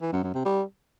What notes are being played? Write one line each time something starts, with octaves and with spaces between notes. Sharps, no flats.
E3
F#2
F#2
C3
G3